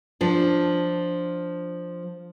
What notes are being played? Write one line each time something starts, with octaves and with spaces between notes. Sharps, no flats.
F3 D4